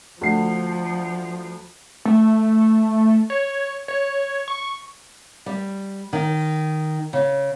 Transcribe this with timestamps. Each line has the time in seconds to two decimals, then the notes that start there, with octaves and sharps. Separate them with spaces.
0.21 D2 F3 C7
2.05 A3
3.30 C#5
3.88 C#5
4.48 C#6
5.46 G3
6.13 D#3
7.13 C#3